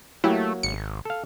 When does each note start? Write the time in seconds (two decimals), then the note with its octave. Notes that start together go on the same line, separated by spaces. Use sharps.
0.24 F#3 A3 A#3 E4 G4
0.63 G#1 C#7
1.05 A4 F5